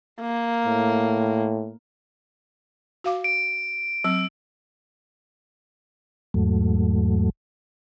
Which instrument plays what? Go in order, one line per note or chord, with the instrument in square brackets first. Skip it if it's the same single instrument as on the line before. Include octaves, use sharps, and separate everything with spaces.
[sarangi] A#3
[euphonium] A2
[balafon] F#4 F5 D6
[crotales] D7
[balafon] F#3 C4 [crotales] E6
[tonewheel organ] E2 G#2 F#3 A3